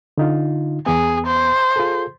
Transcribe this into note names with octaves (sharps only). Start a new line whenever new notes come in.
D3 D#4 F4
E2 B3 G#4
C5
F4 G#4 A4